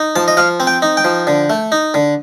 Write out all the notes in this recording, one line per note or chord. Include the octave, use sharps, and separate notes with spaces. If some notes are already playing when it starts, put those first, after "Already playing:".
Already playing: D#4
F3 A5
D#5
F3 F5
C4
G5
D#4
G5
F3
D3
A3
D#4
D3